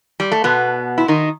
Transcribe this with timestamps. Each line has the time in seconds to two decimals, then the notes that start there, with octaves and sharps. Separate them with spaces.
0.20 G3
0.32 A3
0.44 B2 B3
0.98 E4
1.08 D#3 D#4